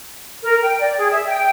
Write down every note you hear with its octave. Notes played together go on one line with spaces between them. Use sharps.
A#4
G5
D5
G#4
E5
G5